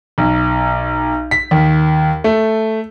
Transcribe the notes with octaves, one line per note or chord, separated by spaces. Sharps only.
B1
B6
D#2
A3